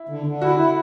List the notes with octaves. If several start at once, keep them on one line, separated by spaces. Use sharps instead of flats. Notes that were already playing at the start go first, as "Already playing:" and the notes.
Already playing: E4
D3
D3
E4 F#4
E4